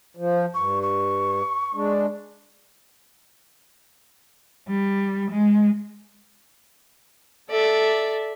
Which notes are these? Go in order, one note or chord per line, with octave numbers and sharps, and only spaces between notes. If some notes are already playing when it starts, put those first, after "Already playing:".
F3
G2 C#6
C#6
G#3 D4
G3
G#3
A4 D5 E5